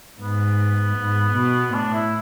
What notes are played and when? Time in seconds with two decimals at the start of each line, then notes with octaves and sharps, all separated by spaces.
0.20 G#2 B3
0.97 G#2
1.35 B2
1.74 A2 D4
1.93 E4